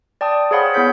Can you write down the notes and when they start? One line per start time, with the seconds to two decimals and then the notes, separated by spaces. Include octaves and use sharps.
0.21 D5 G5 A5 D#6
0.51 G#4 C5 C#5 F5 F#5 B5
0.74 B3 E4 G#4 C#5 G6 B6